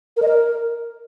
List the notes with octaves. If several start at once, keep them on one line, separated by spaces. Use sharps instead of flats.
A#4
D#5
A#4